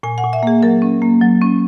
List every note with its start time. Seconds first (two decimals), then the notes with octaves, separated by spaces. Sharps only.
0.03 A#2 G#5
0.18 F#5
0.24 A#2
0.33 E5
0.43 A#3 G#4
0.63 F#3 A#4
0.82 C#4
1.02 A#3
1.22 F#3
1.42 C#4